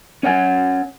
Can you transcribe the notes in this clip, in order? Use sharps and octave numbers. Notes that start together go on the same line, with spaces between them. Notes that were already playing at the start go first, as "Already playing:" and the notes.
C#4 C#5 F#5 G#5